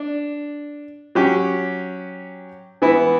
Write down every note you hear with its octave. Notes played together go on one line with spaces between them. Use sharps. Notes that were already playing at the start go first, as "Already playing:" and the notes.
Already playing: D4
F#3 C#4 G4
E3 B3 E4